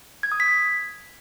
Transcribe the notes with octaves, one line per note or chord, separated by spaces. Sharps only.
G#6
D#6
B6
G#6